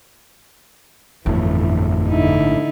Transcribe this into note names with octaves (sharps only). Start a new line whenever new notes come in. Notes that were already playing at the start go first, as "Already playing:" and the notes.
G1 F2 A2 E3
D3 D#4 E4